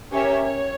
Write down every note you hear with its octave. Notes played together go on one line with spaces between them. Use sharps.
C#4 G4 A#4 C#5 E5
C#5